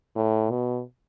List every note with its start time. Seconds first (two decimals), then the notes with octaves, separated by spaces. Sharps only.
0.16 A2
0.51 B2